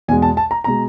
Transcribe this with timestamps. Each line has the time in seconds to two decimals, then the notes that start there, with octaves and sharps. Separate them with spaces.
0.08 E2 B2 G#3 G#5
0.22 A5
0.37 A5
0.51 A#5
0.64 B2 G#3 A#5